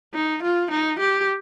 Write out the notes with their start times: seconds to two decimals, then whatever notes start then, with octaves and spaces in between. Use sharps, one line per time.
0.14 D#4
0.43 F4
0.71 D#4
0.99 G4